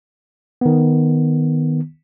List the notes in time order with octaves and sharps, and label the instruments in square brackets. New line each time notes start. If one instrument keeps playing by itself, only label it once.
[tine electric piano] D#3 B3